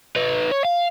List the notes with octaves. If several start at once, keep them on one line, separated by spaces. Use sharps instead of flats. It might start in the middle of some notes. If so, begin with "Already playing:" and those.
D#4 B4
C#5
F5